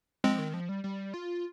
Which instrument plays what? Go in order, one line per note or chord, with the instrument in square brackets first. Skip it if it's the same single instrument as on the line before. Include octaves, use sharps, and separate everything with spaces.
[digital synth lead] F3 [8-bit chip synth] G#3 C4
[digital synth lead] D#3
F3
G3
G3
F4